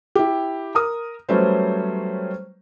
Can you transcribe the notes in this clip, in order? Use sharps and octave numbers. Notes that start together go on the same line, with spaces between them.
E4 G4
A#4 D#6
F#3 G3 A3 C#4 B4 C5